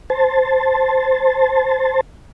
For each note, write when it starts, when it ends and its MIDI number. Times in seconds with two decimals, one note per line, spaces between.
0.10 2.01 72
0.10 2.01 81